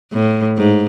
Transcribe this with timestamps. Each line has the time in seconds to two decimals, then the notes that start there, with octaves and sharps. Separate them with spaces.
0.13 A2
0.58 G#2